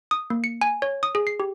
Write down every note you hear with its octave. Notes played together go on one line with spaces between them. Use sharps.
D#6
A#3
C#7
G#5
C#5
D#6
G#4
C7
G4